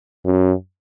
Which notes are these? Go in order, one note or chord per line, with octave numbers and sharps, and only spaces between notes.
F#2